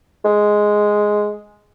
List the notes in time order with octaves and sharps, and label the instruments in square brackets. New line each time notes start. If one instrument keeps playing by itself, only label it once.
[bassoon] G#3